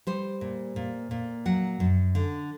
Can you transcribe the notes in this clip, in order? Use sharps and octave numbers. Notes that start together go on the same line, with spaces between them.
G3 C5
A#2
A#2
A#2
F#3 F#5
F#2
D3